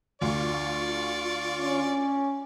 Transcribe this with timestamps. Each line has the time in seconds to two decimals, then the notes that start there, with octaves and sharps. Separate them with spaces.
0.21 D2 F4 D5 C#6
1.61 C#4